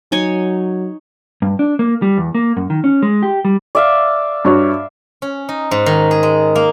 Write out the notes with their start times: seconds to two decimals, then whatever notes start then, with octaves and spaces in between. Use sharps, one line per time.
0.12 F#3 D#4 C#5 G#5
1.42 G2
1.59 D4
1.79 A#3
2.02 G3
2.17 E2
2.35 A#3
2.57 F#2
2.70 D#3
2.84 C#4
3.02 G#3
3.23 G4
3.45 G3
3.75 D5 E5 F5
4.45 G2 F#4 C#5
5.22 C#4
5.49 D#4
5.71 G#2
5.86 D#3
6.11 G#4
6.23 G#3
6.56 A#3